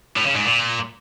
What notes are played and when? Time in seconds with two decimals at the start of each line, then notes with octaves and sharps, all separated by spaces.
0.17 A2
0.26 C#3
0.36 G#2
0.45 A#2